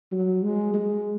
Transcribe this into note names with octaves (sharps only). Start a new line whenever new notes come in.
F#3
G#3
G#3